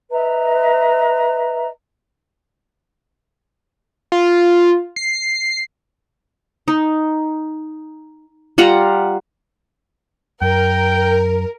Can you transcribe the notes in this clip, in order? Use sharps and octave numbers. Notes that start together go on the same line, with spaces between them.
B4 D#5 E5 A#5
F4
C7
D#4
G3 F4 F#5 A#5
F#2 A#4 G5